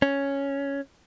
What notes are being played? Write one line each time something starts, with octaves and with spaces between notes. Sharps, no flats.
C#4